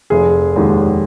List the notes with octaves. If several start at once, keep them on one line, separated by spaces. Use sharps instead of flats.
F1 G#4
D#2 D#3 G#3